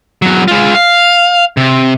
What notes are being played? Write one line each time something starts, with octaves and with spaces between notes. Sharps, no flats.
E2 F#3
G#3 F4
F5
C3